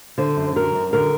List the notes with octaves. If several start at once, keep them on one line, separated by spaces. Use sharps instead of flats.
D3 C5
F#2
F#3 A#4
F#2
D3 A#4